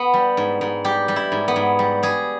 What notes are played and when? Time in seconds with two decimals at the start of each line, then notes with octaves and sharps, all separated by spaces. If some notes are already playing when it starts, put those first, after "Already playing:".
Already playing: B3
0.14 G3
0.37 G#2
0.61 G#2
0.85 G3 G4
1.08 G3
1.16 E4
1.32 G#2
1.48 B3
1.56 G#2
1.79 G3
2.03 G3 G#4